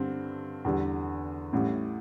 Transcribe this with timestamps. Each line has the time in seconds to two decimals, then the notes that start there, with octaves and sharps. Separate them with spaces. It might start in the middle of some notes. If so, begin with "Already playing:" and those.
Already playing: G2 D3 C4
0.65 E2 D3 G3
1.53 A1 A2 G3